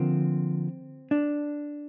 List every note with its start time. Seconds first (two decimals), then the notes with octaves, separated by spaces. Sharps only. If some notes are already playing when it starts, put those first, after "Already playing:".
Already playing: D3 F3 A#3 C4
1.11 D4